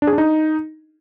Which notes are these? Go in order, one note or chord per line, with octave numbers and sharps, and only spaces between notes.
D4
G#4
D4
D#4